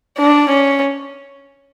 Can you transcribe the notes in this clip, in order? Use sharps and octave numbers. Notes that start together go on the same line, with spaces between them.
D4
C#4